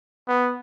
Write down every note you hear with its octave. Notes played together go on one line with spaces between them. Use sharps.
B3